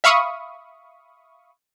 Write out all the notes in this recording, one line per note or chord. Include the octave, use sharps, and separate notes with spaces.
E5 F5 B5 C#6 D#6